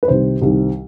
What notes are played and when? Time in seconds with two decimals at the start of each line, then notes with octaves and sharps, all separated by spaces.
0.03 B4
0.08 C2 C3 D#3 C5
0.42 C2 C3 D#3